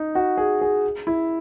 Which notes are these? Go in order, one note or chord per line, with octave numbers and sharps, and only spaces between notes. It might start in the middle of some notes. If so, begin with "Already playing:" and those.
Already playing: D#4
F#4
G#4
G#4
E4